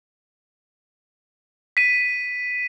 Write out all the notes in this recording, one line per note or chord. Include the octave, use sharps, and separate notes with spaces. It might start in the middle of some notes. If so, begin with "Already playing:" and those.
B6 D#7